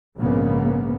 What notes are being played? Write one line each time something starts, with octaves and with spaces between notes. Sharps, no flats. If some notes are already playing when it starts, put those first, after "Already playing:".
A#1 G#2 C#3 A#3 B3